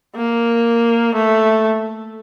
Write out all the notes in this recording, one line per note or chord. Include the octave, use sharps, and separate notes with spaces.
A#3
A3